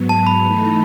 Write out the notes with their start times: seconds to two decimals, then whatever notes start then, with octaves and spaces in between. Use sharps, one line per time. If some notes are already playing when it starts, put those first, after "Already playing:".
Already playing: G#2 F#3 B3
0.09 A5
0.27 B5
0.44 E3 A3 D#4